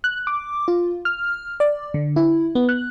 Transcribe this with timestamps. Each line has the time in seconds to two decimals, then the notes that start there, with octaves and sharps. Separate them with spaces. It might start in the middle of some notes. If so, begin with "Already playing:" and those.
0.04 F#6
0.27 D6
0.68 F4
1.05 F6
1.60 D5
1.94 D3
2.16 E4
2.55 B3
2.69 F#6